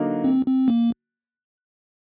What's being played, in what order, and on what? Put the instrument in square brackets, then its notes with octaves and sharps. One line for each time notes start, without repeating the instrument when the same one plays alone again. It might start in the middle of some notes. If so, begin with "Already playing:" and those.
Already playing: [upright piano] D3 F#3 A#3 D#4 F#4
[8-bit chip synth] C4
C4
A#3